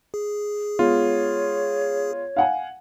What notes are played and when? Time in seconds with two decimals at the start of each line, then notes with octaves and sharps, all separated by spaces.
0.14 G#4
0.79 G#3 B3 F4 C#5
2.36 F5 F#5 G#5